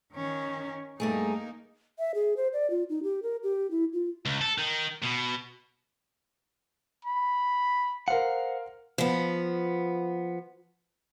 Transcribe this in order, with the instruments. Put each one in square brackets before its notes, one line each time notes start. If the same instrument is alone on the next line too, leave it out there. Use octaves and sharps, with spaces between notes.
[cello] D#3 C#4
[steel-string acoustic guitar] G2 A3 G#4 [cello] A#3 D#4
[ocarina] E5
G#4
C5
D5
F4
D#4
G4
A#4
G4
E4
F4
[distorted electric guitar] C#2
A4
D#3
B2
[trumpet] B5
[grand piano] A#4 F5 [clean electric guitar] C5 F#5
[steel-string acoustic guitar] F3 B3